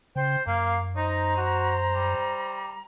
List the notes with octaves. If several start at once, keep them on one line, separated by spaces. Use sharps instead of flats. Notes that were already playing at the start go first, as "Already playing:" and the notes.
C#3 C5 G5
F#2 A#3 F5
D#4 C5 A#5
F#4
G3